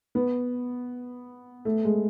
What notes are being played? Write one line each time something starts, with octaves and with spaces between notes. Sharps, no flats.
B3
A3
G#3